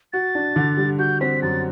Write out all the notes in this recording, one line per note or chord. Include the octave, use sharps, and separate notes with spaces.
F#4 A6
D4
D3
G3
F#4 G6
C4 B6
F#2 A6